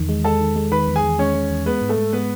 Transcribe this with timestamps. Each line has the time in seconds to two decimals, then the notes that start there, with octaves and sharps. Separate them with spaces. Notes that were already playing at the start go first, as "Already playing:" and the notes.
Already playing: E2 D#3
0.09 G#3
0.24 G#3 A4 A5
0.40 D#3
0.56 G#3
0.72 D#3 B4 B5
0.88 E2
0.96 G#4 G#5
1.03 E2
1.19 G#3 C#4 C#5
1.34 G#3
1.50 E2
1.66 G#3 B3 B4
1.81 G#2
1.89 A3 A4
1.98 G#2
2.13 G#3 B3 B4